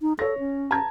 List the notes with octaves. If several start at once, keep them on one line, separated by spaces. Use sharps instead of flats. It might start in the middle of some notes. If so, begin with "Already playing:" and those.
D#4
A4 C#5 A#6
C#4
A5 A#5 G#6